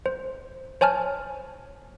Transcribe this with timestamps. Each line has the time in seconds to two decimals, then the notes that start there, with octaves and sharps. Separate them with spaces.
0.06 C5
0.81 C5 C#5 G#5 A5 F6